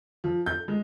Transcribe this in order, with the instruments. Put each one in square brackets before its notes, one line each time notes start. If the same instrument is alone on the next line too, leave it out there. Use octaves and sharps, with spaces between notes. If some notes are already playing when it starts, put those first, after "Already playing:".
[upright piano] F3
G6
G#3